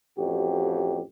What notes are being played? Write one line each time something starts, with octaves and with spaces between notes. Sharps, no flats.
A1 F2 F#4 G4